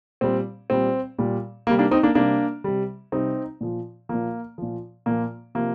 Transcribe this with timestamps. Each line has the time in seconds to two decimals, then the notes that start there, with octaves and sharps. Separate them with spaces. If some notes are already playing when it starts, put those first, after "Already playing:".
0.21 A#2 G3 C4
0.70 A#2 G3 C4
1.18 A#2 G3
1.67 C3 A#3
1.71 G3
1.79 A#3 D4
1.91 C4 D#4
2.03 A#3 D4
2.15 C3 G3 A#3 D4
2.64 C3 G3
3.12 C3 G3 C4 D#4
3.61 A#2 F3
4.09 A#2 F3 A#3
4.58 A#2 F3
5.06 A#2 F3 A#3
5.55 C3 F3 A#3